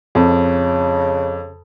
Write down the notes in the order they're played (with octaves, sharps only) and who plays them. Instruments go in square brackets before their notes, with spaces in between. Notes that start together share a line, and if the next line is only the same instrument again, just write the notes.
[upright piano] F2 [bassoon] C#3